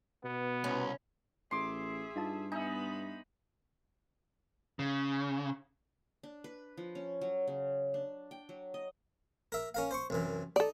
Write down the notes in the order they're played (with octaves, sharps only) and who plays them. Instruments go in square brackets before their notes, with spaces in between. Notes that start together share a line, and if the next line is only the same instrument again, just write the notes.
[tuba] B2 [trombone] B3
[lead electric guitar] C2 [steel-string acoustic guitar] C#4
[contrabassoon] A1 [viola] G#4 E5 [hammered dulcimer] C6 D6
[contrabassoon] G2 [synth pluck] D#4 F4 A5
[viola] B3 B5 [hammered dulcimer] D#4 [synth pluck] E5 G#5
[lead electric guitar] C#3
[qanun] D4
B4
F3
C#4
F#3
C#3
D4
G5
F#3
D#5
[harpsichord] A#4 E5
C#4 A#4 F5
C5 C6 C#6
C2 F#2 E3
[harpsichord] D#4 [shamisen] A4 D5